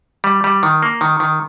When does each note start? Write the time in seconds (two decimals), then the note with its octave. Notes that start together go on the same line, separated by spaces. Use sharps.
0.24 G3
0.44 G3
0.63 D#3
0.83 A#3
1.01 D#3
1.20 D#3